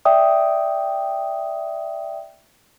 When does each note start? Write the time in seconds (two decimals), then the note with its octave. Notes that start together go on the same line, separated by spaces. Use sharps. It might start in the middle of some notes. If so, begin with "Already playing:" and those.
0.05 D5 E5 G5 D#6